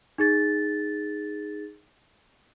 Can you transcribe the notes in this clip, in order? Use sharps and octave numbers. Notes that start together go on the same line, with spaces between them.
D#4 G#4 A6